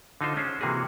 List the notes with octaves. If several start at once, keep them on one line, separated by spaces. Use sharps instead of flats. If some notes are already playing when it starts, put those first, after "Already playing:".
D3 D#4 F4 C5
G#3 C#4 C5
C3 E3 A#3 F#4 G#4